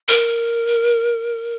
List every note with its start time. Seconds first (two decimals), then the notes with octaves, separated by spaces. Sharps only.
0.08 A#4